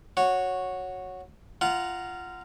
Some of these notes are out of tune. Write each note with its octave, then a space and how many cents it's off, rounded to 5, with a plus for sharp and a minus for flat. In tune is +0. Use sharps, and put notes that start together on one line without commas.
F#4 -10 C#5 -5
F4 -15 F#5 +0 A#5 +0